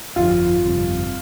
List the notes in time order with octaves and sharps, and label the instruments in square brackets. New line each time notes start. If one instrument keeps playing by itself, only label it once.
[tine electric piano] G1 F2 F3 [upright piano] F4
[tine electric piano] G1 F2 C3 G3 C4